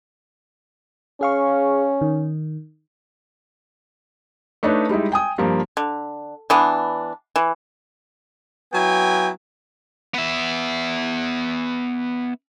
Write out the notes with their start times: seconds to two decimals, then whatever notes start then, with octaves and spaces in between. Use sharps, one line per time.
1.21 C#4 G#4 F5 C#6
2.01 D#3
4.63 A3 D4 D#4 B4 C#5
4.89 G3 G#3 D#4 E4
5.12 G5 G#5 D#6
5.38 G2 F3 A#3
5.77 D3
6.50 E3 B3 D4
7.36 E3
8.73 F#3 B3 E4 G5 G#5
10.14 B3 E5